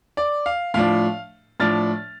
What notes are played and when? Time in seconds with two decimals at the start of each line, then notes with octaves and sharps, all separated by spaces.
0.17 D5
0.46 F5
0.74 A2 F3 D4 F5
1.60 A2 F3 D4 F6 A6